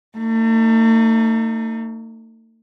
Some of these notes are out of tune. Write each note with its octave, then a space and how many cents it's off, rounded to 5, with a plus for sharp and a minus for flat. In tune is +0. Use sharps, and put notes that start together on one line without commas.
A3 +40 D#4 +0